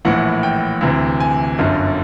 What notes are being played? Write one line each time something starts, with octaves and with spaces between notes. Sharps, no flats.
A#1 A2 E3 F#5
G5
D2 C3 E3
G#5
G1 F#2 D3